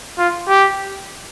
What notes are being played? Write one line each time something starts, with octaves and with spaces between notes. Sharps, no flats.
F4
G4